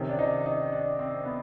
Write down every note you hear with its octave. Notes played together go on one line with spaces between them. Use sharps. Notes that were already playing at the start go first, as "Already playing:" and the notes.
Already playing: C3 D#3 C#4
D4
D#4
D#4
D4
C4
B3